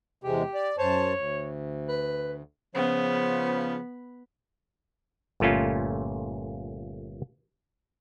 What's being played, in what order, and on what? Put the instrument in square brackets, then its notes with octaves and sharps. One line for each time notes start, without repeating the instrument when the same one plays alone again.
[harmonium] E2 C3 G#3 [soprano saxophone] G4
[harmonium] D5
[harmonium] F#2 C5 A5 [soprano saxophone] C#5
[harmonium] D2
[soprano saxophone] B4
[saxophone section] C#3 F3 [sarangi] B3 [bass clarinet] C5
[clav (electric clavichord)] G1 A#2 A3 C#4 F4